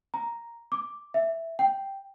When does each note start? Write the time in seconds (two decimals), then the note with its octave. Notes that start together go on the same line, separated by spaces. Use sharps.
0.14 A#5
0.72 D6
1.14 E5
1.59 G5